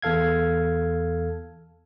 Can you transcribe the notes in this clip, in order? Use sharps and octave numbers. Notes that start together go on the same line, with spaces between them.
E2 A4 F5 G#6